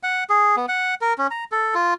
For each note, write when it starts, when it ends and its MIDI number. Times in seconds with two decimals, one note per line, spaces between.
0.03 0.24 78
0.30 0.56 68
0.57 0.66 59
0.68 0.95 78
1.01 1.13 70
1.18 1.27 61
1.31 1.45 82
1.52 1.74 69
1.75 1.94 65